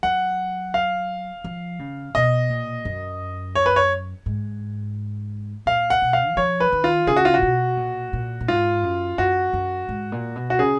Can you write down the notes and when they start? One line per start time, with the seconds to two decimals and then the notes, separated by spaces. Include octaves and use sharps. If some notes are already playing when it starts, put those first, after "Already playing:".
0.03 F#3 F#5
0.74 F5
1.44 F3
1.79 C#3
2.15 B2 D#5
2.50 A#2
2.85 F#2
3.55 C#5
3.66 B4
3.76 C#5
4.26 G#2
5.66 A#2 F5
5.90 F#5
6.02 B2
6.13 F5
6.32 F#3
6.37 F3 C#5
6.60 B4
6.72 D#3
6.84 F4
7.07 C#3 G#4
7.16 F#4
7.25 F4
7.34 A#2 F#4
7.43 B2
7.77 A#2
8.13 A#2
8.41 A#2
8.48 G#2 F4
8.83 F#2
9.18 F#2 F#4
9.53 F#2
9.89 G#2
10.12 A#2
10.36 B2
10.50 F#4
10.59 C#3 G#4